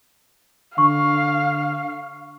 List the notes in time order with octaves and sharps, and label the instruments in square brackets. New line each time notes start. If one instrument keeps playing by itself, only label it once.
[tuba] D3 [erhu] F5 [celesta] C#6